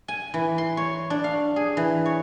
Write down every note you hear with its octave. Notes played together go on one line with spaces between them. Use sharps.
G#5
E3
C6
C#5
D4
F5
G#4
E3
C#5